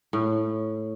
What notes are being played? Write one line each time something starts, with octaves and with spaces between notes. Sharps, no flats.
A2